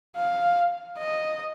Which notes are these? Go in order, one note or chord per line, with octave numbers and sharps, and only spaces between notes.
F5
D#5